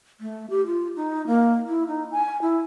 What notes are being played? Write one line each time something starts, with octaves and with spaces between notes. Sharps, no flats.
A3
G4
F4
D#4
A#3
E4
D#4
G#5
E4